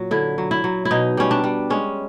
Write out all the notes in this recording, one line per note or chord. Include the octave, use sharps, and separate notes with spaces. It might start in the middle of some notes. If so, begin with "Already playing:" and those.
Already playing: A#2 F#3
D3 E4
F#3
E4
F#3
E4
B2 D#4
G3 C#4
D4
G3
G#3 C#4